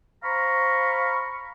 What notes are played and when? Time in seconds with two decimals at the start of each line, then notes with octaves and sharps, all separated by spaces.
0.24 C5 F5 A#5 B5 C#6